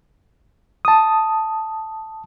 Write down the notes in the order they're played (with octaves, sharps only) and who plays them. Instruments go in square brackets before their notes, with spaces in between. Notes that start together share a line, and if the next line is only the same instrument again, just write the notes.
[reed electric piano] A5 D#6